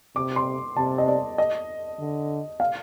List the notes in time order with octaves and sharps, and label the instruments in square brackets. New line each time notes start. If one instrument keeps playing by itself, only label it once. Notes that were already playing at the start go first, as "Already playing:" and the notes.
[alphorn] C3 [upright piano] D6
[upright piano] C6
[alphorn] C3 [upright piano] A5
[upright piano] D#5
D5
D#5
[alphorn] D3
[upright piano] F5